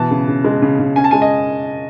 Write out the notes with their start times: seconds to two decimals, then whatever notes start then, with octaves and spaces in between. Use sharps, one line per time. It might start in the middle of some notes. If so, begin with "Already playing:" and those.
Already playing: B2 E3 A5
0.11 C#3
0.28 C#3
0.44 G#3
0.62 C#3
0.79 C#3
0.96 C#4 G#5
1.04 A5
1.11 G#3 G#5
1.22 D#5